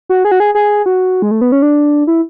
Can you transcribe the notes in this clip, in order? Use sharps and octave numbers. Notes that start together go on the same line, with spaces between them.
F#4
G#4
F#4
G#4
G#4
F#4
G#3
A3
B3
C#4
D4
E4